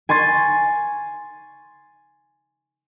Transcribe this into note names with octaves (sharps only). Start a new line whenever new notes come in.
G#5 C6 C#6 A6